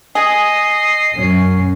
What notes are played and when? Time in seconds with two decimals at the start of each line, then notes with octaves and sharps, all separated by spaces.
0.15 G#4 D#5 C7
1.16 F#2 F#3 C#4